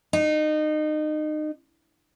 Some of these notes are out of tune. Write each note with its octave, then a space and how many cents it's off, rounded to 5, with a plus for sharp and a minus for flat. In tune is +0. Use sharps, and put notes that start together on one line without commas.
D#4 -25